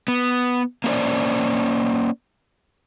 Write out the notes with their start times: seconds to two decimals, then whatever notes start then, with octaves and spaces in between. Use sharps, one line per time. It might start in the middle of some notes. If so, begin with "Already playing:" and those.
0.08 B3
0.84 A#3 C#4 E4 A#4 C5 D5